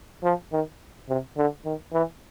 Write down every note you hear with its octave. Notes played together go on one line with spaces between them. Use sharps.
F3
D#3
C3
D3
D#3
E3